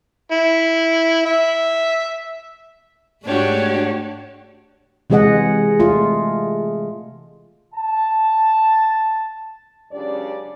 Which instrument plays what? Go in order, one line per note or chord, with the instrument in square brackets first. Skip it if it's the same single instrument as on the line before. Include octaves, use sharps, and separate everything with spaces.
[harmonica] E4
E5
[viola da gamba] G#2 A3 D4 [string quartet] F#4 G4 C#5
[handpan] C3 E3 G#3 G#4 D#5 F#5
A3 F4
[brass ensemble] A5
C#2 F#2 C#3 D4 G4 D5